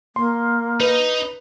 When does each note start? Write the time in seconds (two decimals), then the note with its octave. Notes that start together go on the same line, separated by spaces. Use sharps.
0.16 A#3 C6
0.80 D#4 B4 D#5